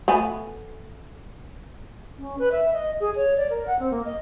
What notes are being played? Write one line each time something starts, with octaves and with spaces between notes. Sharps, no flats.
A3 B3 G#5
C#4
B4
E5
D#5
G#4
C#5
D5
A#4
F#5
C4
A#3
D#5